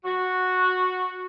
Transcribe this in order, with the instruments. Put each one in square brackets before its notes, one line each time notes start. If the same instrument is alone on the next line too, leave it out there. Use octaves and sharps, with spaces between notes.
[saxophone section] F#4